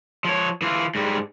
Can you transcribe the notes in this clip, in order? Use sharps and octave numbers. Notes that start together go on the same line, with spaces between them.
F3 C#5
E3 F4
G#2 G3